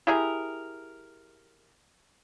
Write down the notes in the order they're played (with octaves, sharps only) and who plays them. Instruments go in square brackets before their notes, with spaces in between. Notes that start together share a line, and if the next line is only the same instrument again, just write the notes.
[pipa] E4 G4 G#4 A#4